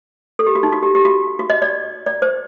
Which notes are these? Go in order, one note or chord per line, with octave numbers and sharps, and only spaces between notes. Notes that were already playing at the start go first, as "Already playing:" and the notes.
A4
G4
F#4
D#4
F#4
G4
G4
F#4
F#4
D#5
D5
D5
C5